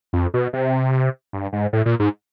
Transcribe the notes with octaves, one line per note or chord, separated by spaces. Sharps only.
F2
B2
C3
G2
G#2
A2
A#2
G#2